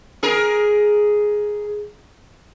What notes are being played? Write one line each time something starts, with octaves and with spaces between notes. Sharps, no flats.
G#4 A#4